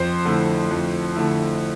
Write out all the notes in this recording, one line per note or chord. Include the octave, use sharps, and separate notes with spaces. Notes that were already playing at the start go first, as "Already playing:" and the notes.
Already playing: F2 C5
D3 A3 E4
F2
D3 A3 E4